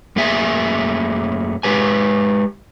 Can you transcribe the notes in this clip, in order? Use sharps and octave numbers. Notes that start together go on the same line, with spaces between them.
F#2 A3 A#3 G#4 E5 G#5
G#3 G4 B4 G#5